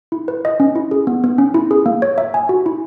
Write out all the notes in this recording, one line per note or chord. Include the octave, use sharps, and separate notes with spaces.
E4
B4
D#5
C#4
E4
G#4
B3
B3
C#4
E4
G#4
A#3
C#5
E5
G#5
F#4
E4